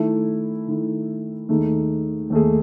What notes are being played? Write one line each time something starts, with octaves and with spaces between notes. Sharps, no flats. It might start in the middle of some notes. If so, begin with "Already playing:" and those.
Already playing: D#3 A3 E4
D#3 A3 E4
D#2 D#3 A3 D#4 G#4
D#2 D#3 A3 D#4 G#4